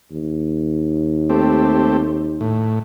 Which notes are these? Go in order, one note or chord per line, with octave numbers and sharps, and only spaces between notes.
D#2
A3 C4 G4
A2